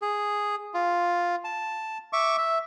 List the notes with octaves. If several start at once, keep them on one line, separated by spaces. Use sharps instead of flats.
G#4
F4
A5
E5 C#6 D6
E5